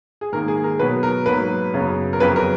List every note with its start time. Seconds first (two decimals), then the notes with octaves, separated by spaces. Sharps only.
0.21 G#4
0.32 G#2 D#3 A#3 A#4
0.48 G#4
0.64 A#4
0.79 B2 F#3 B3 B4
1.03 A#4
1.26 G#2 F#3 A#3 B4
1.74 F#2 C#3 F#3 B3
2.13 A#4
2.20 F2 C#3 F#3 B3 B4
2.36 A#4